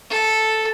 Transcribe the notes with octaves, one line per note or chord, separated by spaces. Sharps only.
A4